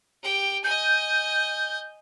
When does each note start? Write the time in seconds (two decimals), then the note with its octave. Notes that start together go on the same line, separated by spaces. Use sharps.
0.23 G4 G5
0.64 D#5 G#5 G6